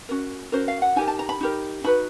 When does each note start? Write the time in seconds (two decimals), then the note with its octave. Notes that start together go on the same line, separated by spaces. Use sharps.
0.09 C#4 F#4 A#4
0.52 C#4 F#4 A#4 C5
0.68 F5
0.82 F#5
0.96 D#4 G4 A#4 G#5
1.07 A5
1.19 A#5
1.29 B5
1.41 D#4 G4 A#4
1.84 D#4 F#4 B4 B5